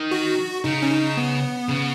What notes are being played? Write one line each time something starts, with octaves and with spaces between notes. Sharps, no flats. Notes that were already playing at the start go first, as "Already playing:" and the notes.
Already playing: D#3
F#4
C#3 D#4
C#4
D#4
B3
C#3